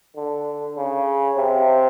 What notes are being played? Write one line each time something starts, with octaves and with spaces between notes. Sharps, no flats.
D3
C#3
C3